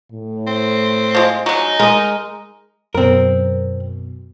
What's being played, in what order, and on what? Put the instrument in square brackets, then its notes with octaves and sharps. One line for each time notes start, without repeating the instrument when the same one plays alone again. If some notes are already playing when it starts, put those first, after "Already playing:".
[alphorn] A2
[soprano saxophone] C4
[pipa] F3 G#3
[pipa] F#3 G#3 [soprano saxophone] D#4
[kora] G#3 D#5 [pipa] A#4
[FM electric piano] F#2 B2 [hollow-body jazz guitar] C4 A#4